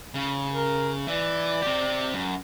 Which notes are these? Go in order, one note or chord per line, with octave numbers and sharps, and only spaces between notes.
C#3
A#4
E3 D5
C4 G4
F#2